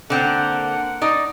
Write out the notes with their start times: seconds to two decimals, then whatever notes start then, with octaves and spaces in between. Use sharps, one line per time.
0.10 D3 A#3 C4 F#5
1.02 D#4 D5